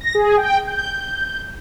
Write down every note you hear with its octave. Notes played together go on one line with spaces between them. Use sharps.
A#6
G#4
G5
G6